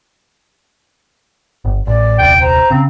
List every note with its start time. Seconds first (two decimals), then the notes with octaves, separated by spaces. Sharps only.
1.65 G1
1.87 A1 D5
2.19 D#1 C2 G5
2.41 C5 A#5
2.71 C#3 C4